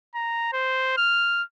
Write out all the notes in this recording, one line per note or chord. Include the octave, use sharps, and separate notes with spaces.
A#5
C5
F6